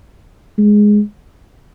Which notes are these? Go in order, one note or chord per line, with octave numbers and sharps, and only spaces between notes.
G#3